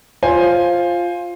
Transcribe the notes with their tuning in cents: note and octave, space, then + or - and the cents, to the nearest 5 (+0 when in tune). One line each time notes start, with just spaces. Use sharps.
F4 +0 C5 +15 G#5 +0